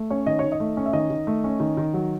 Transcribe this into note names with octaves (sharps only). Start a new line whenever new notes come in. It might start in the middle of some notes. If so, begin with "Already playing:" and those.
Already playing: A3
C#4 C#5
D#3 D#5
D#3 C#5
D#5
A3
C#4
E5
D#3 D#5
D#3
A3
C#4
D#3
D#3
F#3